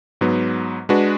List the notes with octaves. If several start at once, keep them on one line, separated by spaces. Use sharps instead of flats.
G#2 F#3 B3
G#3 D4 F#4 B4